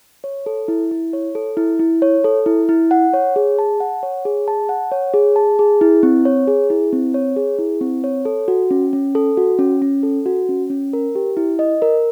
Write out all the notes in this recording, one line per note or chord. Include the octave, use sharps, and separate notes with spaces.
C#5
A4
E4
E4
C#5
A4
E4
E4
C#5
A4
E4
E4
F#5
C#5
G#4
A5
F#5
C#5
G#4
A5
F#5
C#5
G#4
A5
G#4
E4
C4
C#5
G#4
E4
C4
C#5
G#4
E4
C4
C#5
A4
F#4
C#4
C#4
A4
F#4
C#4
C#4
A4
F#4
C#4
C#4
A#4
G4
E4
D#5
A#4